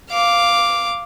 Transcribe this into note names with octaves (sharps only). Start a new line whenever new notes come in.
F5 D6